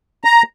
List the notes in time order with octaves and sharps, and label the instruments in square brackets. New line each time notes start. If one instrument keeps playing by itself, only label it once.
[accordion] A#5